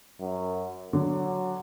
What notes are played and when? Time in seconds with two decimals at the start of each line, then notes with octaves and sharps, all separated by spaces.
0.20 F#2
0.93 D3 F#3